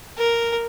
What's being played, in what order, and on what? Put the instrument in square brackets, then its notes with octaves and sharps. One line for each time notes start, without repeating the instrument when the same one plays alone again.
[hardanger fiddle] A#4